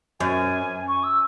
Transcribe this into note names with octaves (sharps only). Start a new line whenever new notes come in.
F#2 G#5
C#6
E6